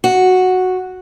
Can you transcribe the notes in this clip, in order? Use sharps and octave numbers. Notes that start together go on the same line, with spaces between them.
F#4